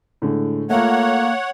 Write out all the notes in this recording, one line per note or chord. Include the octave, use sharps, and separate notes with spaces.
A2 D3 G#3
A3 A#3 F4 C#5 F#5